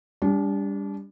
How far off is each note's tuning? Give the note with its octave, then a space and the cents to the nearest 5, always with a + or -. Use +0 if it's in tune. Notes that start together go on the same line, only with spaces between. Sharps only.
G3 +30 D4 -30